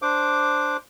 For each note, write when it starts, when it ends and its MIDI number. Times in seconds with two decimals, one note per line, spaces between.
0.02 0.77 62
0.02 0.77 72
0.02 0.77 86